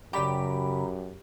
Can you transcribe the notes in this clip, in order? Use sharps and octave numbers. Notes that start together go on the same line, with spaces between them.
F#2 C#3 G4 D5 G5 A#5 B5